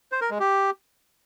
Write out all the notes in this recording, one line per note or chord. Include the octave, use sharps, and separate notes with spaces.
C5
A#4
G#3
G4